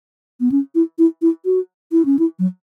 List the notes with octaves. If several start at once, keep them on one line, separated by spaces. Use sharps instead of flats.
B3
C#4
E4
E4
E4
F#4
E4
C#4
E4
F#3